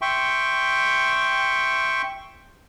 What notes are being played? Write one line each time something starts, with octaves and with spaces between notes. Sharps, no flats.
E5 G5 C6 C#6